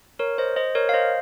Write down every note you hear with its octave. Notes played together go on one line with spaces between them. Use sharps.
A#4 C#5
C5 D#5
C5 D#5
A#4 C#5
F5
C5 D#5